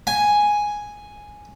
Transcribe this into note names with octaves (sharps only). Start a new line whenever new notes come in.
G#5